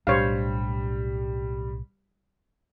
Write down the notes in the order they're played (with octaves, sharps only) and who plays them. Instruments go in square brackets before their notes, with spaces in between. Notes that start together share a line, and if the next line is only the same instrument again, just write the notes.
[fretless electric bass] B1 A2 D4 [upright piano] G3 [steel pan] C5 C#5 F5